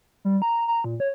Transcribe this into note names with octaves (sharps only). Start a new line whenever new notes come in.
G3
A#5
A#5
A#2
C#5